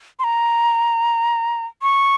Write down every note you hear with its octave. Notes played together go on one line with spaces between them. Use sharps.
C6
A#5
C#6